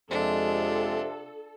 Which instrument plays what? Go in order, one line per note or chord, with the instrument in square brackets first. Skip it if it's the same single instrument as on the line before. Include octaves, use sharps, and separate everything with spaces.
[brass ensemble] F2 G#3 [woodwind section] C3 [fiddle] D4 F4 [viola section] A4